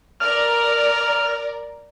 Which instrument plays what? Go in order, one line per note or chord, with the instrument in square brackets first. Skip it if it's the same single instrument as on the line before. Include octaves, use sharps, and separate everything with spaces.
[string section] A#4 D5 [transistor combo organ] F6